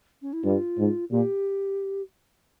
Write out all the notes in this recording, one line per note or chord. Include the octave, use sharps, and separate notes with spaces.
C#4
E4
G2 F4
G#2
A#2 G4